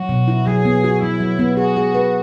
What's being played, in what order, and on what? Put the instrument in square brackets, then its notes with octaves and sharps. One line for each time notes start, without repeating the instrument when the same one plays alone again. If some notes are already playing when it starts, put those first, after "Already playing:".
Already playing: [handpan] F#3 [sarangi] F#4
[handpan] B2
E4
[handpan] F#3 [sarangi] G#4
[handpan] B3
F#4
[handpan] F#3 [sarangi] E4
[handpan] F#3
B3
[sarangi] F#4 [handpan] G#4
[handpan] G#4
B4